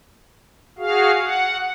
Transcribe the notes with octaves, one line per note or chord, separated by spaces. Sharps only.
F#4 G#4 F5
F#5